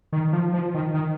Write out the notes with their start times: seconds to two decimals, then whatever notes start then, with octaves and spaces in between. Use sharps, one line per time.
0.13 D#3
0.33 F3
0.54 F3
0.74 D#3
0.94 D#3